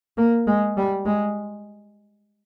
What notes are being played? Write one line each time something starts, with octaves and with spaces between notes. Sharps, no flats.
A#3
G#3
G3
G#3